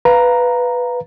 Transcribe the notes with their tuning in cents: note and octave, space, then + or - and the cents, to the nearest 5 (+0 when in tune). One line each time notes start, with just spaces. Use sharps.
B4 +0 F5 -5 A#5 +0